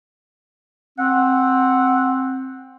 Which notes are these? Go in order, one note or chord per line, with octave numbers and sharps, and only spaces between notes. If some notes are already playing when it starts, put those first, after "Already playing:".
C4 F#5